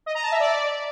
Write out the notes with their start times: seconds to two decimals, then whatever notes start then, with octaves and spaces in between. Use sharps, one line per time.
0.06 D#5
0.15 A#5
0.23 A5
0.32 E5
0.40 D5